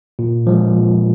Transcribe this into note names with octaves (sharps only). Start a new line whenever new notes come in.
A#2
F3 G#3
A#2